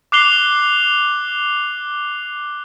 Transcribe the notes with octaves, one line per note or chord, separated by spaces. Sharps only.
D6 F#6 C7 F7 G7